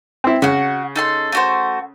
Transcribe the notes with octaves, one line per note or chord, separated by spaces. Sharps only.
C4 E4
C#3 F#4 F#5
D#4 A4 C6
A3 F#4 C5